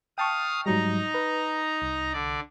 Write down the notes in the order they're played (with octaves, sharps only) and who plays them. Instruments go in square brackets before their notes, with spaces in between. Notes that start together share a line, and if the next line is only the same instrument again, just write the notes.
[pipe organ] F5 D#6 [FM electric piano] G5 A5 C#6
[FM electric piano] G#2 F#3 G3 [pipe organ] D#4 A#5
[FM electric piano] B4
C2
[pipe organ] D3 D5